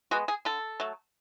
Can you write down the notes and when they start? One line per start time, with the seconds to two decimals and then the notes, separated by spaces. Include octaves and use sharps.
0.11 G#3 B3 F#4
0.28 G#4
0.45 D3 A4
0.80 F#3 A3